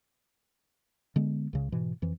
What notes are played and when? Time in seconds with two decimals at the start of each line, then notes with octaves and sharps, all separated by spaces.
1.16 D3 G#3 B3
1.53 C#2 C#3
1.72 G#2 B2 E3
2.02 F2 E3